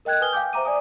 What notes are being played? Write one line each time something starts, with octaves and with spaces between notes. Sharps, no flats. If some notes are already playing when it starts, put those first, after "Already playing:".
A#4 D#5 G5 F#6 G#6
B4 G#5 D#6 F6 G7
F5 G5 G#5 D6 G6
C5 E5 A#5 D6 D#7
D5 G#5 D#6